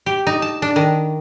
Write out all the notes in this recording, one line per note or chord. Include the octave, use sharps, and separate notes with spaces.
G4
D#4
A5
D4
D#3